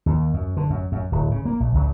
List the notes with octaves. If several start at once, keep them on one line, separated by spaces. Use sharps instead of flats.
D#2
F#2
D3
F#2
F#2
D1
C#3
A#3
A#1
C#2